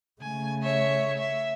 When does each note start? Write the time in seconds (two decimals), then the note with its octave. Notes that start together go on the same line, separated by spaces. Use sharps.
0.21 C#3 A3 G#5
0.62 C#5 E5
1.18 E5